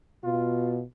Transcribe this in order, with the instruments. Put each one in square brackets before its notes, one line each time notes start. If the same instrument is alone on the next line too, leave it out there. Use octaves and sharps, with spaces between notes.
[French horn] B2 [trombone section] F4